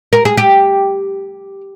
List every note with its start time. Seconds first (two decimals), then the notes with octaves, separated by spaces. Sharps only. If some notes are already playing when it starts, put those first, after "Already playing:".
0.13 A#4
0.25 G#4
0.37 G4